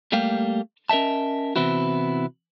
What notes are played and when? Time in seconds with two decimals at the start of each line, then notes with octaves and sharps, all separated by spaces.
0.12 G3 A3 A#3 G4 F5
0.89 C#4 A#4 D#5 E5 A5
1.56 C3 E3 B3 C4 E4 F#4